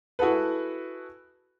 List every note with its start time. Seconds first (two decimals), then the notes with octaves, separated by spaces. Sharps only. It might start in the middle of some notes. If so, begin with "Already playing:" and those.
0.19 E4 F#4 G#4 A4 B4